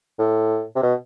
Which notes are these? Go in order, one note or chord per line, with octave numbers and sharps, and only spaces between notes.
A2
C3
B2